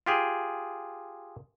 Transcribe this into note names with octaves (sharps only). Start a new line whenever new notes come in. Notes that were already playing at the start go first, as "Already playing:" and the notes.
F4 G4 G#4